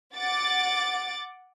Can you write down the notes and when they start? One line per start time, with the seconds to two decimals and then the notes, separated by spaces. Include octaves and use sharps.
0.16 F#5 D6 A6